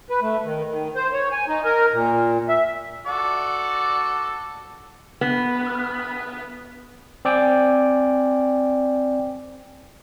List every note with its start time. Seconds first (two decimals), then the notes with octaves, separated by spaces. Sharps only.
0.10 B4
0.21 A3
0.44 D#3
0.71 D#3
0.96 C5
1.13 C#5
1.32 G#5
1.48 D#4
1.64 A#4
1.93 A#2
2.49 E5
3.06 F#4 A4 D5
5.21 B3
7.25 C4 D5 G5 G#5